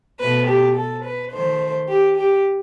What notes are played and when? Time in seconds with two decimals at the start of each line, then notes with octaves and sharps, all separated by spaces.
0.20 B2 A3 B4
0.48 G4
0.76 A4
1.05 B4
1.33 D#3 A3 C5
1.89 G4
2.17 G4